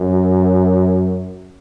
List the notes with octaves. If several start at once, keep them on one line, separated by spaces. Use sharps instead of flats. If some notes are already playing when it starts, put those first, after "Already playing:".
Already playing: F#2